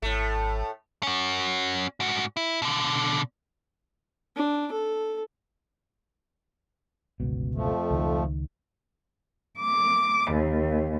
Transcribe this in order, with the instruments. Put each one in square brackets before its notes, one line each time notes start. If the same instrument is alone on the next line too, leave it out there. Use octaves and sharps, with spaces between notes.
[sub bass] G#1 [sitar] A2 A3
[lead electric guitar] C#4 F#4
G#2 F#4
E4
B2 D3
[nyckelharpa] D4
A4
[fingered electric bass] G1 C#2 B2
[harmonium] F2 F3 A3
[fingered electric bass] C#2 D#3
[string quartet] D6
D#2